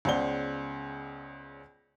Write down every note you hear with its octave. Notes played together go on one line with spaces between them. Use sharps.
C#2 C#3 B3 C5 D5 G7